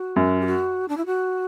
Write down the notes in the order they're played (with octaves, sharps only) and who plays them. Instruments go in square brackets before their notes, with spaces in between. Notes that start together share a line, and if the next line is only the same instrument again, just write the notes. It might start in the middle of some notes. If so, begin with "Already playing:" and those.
Already playing: [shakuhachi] F#4
[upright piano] F#2
[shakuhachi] G4
F#4
D4
E4
F#4